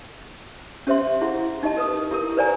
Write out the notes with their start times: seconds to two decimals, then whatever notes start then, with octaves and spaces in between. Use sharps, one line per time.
0.87 C#4 G4 C5 E5 C6
1.21 E4 G#4 F#5
1.63 D#4 G4 D#5 A5
1.77 A#4 B4 D#6
2.11 E4 G4 A#4
2.37 B4 C5 D5 G5 G#5 A#5